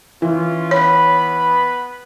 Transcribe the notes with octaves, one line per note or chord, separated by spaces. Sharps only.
E3 C#4 F4
B3 B4 C#5 B5